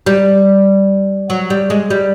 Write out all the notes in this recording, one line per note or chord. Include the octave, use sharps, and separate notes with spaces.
G3
F#3
G3
G#3
G3